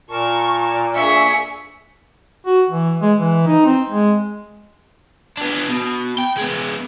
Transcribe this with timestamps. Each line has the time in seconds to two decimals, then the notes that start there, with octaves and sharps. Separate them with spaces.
0.10 A#2 A#4 A5 C#6
0.96 A#3 D4 G#4 E5 C#6
2.46 F#4
2.70 E3
3.02 G#3
3.18 E3
3.47 D#4
3.65 C4
3.89 G#3
5.37 B3 D4
5.68 B2
6.18 G5
6.37 G#3 B3